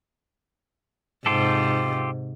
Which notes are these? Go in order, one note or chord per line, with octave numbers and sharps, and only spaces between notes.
G#2 C3 F4 G4 A4